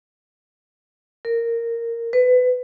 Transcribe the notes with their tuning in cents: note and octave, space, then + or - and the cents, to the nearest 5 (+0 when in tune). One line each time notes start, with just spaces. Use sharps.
A#4 -10
B4 +25